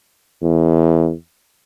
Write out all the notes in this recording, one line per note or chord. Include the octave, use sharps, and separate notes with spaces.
E2